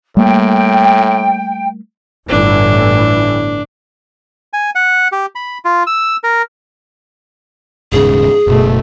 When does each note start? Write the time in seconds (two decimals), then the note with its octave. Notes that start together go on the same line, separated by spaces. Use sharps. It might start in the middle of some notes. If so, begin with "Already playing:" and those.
0.17 A2 G3 A3 A#3 G5
2.29 G1 A2 E3 D4
4.53 G#5
4.75 F#5
5.12 G4
5.35 B5
5.65 F4
5.87 E6
6.24 A#4
7.92 D#1 G#2 C#3 G#4
8.47 F#1 B2 A3